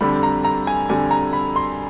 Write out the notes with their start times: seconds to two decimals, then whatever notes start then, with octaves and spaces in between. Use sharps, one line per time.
0.01 F2 D3 G3 B5
0.23 A#5
0.44 A#5
0.67 G#5
0.89 F2 D3 G3 G#5
1.11 A#5
1.33 B5
1.56 C6